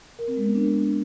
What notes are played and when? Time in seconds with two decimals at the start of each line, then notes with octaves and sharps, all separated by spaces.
0.19 A#4
0.28 C4
0.37 G#3
0.46 B3
0.55 D4